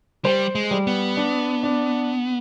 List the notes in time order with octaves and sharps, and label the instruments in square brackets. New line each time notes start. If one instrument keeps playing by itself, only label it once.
[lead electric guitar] G3 [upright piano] C5
[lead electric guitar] G#3
[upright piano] G3
[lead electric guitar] B3
[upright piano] D4
D4